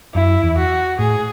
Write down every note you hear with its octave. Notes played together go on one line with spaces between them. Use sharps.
F#2 E4
E2
F#4
A2 G#4